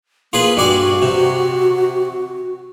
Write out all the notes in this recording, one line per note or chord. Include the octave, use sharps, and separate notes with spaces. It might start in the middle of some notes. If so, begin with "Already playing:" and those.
A#3 F4 G#4 B4
G2 F#4 D5 G#5
C3